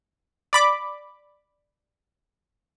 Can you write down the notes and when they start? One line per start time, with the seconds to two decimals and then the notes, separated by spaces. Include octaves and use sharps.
0.53 D5 B5 D6